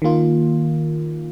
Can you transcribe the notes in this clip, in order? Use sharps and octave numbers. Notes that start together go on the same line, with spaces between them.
D#3 A#3 F4